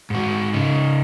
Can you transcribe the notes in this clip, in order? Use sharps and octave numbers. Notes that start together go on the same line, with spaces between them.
G#2 F#4
C#3 D#4